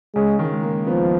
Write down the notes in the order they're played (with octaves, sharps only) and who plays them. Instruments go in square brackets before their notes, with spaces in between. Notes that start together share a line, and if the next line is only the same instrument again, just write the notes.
[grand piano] C#3 [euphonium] G#3
[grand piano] D#3
G#3
A#3
[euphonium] F3 [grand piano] B3